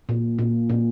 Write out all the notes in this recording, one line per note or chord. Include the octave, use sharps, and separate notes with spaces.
A#2
A#2
A#2